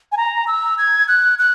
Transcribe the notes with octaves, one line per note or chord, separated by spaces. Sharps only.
G#5
A#5
E6
G#6
F#6
F#6